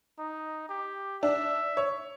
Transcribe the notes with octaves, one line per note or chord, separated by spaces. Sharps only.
D#4
G4
D4 E5
C#5